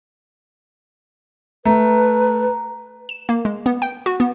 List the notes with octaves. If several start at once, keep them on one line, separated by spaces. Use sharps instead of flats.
A3 B4 A#5
E7
A#3
G#3
B3
G5
F#4
B3